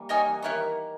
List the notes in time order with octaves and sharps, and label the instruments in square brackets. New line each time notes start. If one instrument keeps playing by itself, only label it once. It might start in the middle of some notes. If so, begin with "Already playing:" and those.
Already playing: [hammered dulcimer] E3 G3 A#3
[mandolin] D#4 A#4 C#5 G#5
[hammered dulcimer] E3
[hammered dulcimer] D#3 [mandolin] B3 E4 A#4 C#5